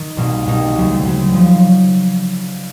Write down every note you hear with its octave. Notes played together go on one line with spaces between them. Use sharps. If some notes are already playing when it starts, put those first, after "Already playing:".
Already playing: D#3
C2 B2 G3 A#3 D#4
C2 B2 G3 A#3 D#4
D2 C#3 F#3
D2 C#3 F#3
C#3 F3